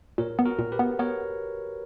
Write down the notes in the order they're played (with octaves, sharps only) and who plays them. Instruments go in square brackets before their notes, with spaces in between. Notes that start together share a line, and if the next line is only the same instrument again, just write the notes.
[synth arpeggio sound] A#2 [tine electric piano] A#4 C#5
[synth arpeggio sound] B3
[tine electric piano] F#4 A#4
[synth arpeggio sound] A#2
[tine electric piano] G4 B4
[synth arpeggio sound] B3
[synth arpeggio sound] B3 [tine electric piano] A#4 C#5